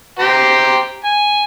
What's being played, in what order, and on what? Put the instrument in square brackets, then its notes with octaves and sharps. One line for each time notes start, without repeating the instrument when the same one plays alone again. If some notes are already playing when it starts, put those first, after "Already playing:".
[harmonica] G4 C5 A#5
G#5